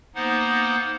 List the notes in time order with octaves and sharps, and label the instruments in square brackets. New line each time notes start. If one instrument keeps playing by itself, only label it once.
[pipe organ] A#3 B3 D#4 C5 F#5